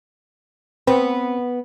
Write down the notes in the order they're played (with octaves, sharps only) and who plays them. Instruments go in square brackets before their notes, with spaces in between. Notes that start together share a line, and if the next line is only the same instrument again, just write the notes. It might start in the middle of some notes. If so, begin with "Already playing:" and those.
[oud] B3 [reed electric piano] C4